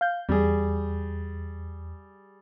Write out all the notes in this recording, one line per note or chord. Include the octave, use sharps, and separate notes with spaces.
F5 G6
E2 G3 G#4